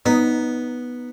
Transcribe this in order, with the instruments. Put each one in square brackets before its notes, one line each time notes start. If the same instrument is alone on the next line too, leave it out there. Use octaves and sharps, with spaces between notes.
[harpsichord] B3 [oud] D#4